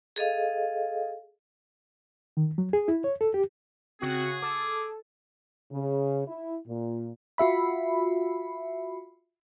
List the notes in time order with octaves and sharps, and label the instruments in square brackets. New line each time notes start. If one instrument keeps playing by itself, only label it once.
[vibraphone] G#4 A4 D#5 F5
[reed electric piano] D#3
F#3
G#4
E4
C#5
A4
G4
[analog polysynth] C#3 F#4 [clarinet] C4 [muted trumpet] G#4
[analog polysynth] A4 [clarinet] D6
[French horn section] C#3
E4
A#2
[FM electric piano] F4 F#4 E5 B5